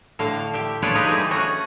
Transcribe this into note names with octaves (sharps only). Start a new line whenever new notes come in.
A2 D3 F5
G4 E5 G5
D4 F4 G#4 B4 C#5 D5
D#4 F4 G4 G#4 B4
D3 E3 G3 G#4
A3 C#4 F#4 G#4 F#5